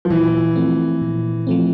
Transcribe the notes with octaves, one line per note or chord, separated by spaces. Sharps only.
F3
A#2 E3
F3 A3 C4
A#2
F3 A3 C4